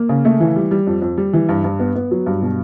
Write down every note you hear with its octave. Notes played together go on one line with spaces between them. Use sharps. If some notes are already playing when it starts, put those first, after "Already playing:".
Already playing: A#3
C#3
A3
E3
G3
G3
F2
F2
G3
E3
G2
G2
B3
B3
F#3
G2
B2